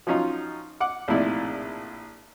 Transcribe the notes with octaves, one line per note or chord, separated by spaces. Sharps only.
F3 F#3 C#4 D#4 F4
F#5 D6
A#1 A2 C3 D#4 E4 D5